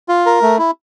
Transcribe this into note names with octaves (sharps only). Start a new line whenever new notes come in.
F4
A#4
A3
E4